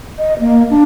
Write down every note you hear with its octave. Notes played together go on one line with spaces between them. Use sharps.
D#5
A#3
D4